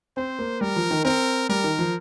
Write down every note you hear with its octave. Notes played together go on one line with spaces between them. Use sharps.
C4 C5
A#3
G3 A#4
F3
D#3
C4 A#4
G3 A#4
D#3
F3